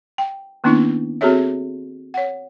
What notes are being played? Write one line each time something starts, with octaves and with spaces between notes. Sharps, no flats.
G5
D#3 A#3 B3 C#4 D4 E4
C4 F#4 G#4 A4 C#5 E5
C#5 F#5